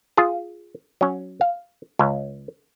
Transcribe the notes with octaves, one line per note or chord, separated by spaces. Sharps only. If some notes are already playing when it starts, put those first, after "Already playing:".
F4 G#4
F#3 C#4
F5
C#2 C#4